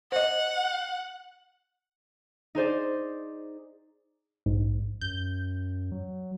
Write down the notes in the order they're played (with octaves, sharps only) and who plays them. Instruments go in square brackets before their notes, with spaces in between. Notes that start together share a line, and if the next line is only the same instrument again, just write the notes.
[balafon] C5 D#5 [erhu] F#5
[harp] D#4 G#4 C5 D5
[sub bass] A#1 [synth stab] G#2
[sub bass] F#2 [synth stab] G6
[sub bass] F#3